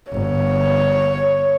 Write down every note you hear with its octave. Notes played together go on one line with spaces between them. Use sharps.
G1 C#5